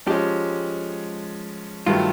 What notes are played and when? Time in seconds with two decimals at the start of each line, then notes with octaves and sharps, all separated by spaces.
0.07 F3 G#3 C#4 G4
1.86 G2 D#3 F#3 A3 F4